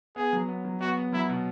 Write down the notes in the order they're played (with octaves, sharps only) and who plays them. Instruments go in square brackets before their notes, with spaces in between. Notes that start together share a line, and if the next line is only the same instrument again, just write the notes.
[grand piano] B3 [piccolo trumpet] G#4
[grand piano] F#3
B3
F#3
[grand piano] B3 [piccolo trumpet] F#4
[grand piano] B3
[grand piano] F#3 [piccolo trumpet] E4
[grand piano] B2